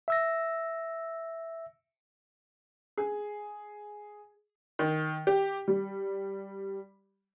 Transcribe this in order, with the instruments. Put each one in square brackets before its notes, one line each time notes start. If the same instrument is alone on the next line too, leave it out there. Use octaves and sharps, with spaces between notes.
[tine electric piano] E5 E6 A#6
[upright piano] G#4
[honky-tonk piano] D#3
G4
G3